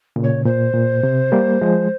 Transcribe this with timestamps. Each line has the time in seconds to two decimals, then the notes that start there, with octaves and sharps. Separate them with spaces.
0.16 A#2 C#3
0.24 C#5
0.45 A#2 C5
0.74 A#2
1.03 C3
1.32 G3 A#3
1.61 F3 G#3